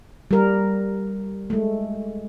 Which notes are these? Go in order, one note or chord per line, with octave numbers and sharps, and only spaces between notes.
G3 A#4
G#3 A3